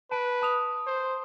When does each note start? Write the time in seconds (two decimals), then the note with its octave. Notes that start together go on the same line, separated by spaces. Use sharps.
0.11 B4 A5 D7
0.42 A5 D#6 F7
0.87 C5